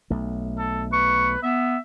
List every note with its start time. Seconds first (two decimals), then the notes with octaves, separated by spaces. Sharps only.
0.10 B1 A3
0.58 A4
0.92 B4 C#6
1.43 B3 E5